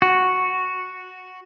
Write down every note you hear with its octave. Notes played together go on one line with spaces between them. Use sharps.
F#4